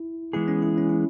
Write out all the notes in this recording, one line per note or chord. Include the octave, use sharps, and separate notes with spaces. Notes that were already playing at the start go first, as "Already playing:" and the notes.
Already playing: E4
E3 G#3 B3 E4 G#4
C#4
E4
C#4
E4